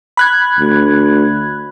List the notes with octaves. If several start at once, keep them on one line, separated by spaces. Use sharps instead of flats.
B5 F#6 G#6
D2